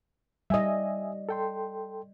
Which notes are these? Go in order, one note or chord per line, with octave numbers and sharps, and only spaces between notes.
G3 D#5 E5 G#5 D#6
A4 G5 C6